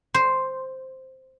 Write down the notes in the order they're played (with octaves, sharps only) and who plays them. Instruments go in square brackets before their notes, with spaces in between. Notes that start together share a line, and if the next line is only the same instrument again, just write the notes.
[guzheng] C5